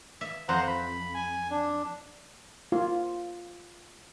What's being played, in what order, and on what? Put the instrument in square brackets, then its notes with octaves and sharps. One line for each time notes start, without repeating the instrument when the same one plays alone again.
[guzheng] E5
[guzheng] F2 [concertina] C5 F#5 A#5
[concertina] B5
G#5
D4
[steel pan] F4